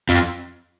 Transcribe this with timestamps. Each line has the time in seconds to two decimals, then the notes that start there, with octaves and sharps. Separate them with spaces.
0.09 F2